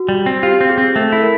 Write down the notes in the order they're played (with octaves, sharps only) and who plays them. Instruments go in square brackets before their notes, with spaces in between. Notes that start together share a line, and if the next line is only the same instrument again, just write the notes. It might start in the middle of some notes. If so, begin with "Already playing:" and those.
Already playing: [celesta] F#4
[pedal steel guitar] G3
C4
[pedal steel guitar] F4 [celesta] G4
[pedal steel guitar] C4
[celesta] G#4
[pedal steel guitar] C4
[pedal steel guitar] A3 [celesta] A4
[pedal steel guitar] E4
[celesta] A#4